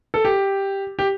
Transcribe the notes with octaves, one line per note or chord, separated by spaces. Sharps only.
A4
G4
G4